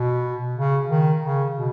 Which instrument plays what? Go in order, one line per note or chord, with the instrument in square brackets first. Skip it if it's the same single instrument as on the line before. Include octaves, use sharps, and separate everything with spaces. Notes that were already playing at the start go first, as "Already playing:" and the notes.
Already playing: [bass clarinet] B2
C#3
D#3
C#3
B2